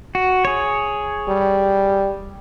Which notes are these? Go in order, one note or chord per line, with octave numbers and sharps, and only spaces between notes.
F#4
G#4 C#5
G3